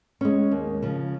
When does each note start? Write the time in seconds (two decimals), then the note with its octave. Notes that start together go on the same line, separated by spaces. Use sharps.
0.21 G#3 C#4
0.51 D#2
0.82 C#3 F3